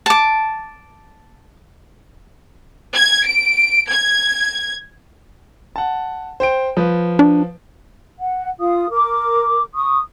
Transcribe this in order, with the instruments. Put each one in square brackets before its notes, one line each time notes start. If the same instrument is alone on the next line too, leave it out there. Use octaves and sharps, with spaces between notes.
[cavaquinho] A5 D6
[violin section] G#6
D7
G#6
[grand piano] F#5 A5
C5 G5 D7
F3 B4
[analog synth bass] D4
[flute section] F#5
F4 F5 D#6
A#4 D6
C#6 D#6